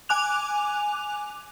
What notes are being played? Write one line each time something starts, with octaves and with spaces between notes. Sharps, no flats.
G#5 D6 F#6 F7